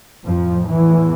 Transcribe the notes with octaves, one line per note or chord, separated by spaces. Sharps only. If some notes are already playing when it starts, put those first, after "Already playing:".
F2 A2 F3
E2 E3